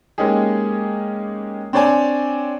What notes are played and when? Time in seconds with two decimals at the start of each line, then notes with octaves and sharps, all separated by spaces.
0.18 G#3 A#3 C#4 D#4 G4 G#4
1.73 C4 D4 C#5 D5 G5 G#5